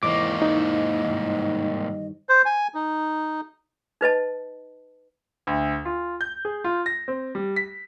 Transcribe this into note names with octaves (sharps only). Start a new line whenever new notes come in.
E2 G#2 A#3 C5 D#5 C#6 D6
D#4
G2 D#3
C5
G#5
D#4
D#4 B4 D#5 A5
D2
F4
G6
G#4
F4
A#6
C4
G3
B6